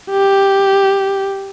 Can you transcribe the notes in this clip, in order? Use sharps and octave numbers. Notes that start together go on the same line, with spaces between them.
G4